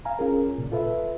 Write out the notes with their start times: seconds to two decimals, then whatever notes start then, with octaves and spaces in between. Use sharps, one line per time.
0.05 F5 G#5 A#5
0.19 C#4 F4 G#4 A#4
0.58 A#2 C#3
0.72 F4 A4 B4 E5